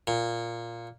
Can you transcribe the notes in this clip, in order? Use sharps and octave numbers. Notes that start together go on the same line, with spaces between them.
A#2